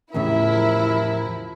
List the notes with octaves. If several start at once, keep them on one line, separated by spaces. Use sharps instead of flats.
E2 A2 C#3 F3 E4 G4 A#4 E5